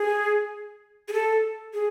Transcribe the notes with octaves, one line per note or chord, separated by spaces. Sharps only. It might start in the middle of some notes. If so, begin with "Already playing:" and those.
Already playing: G#4
G#4
A4
G#4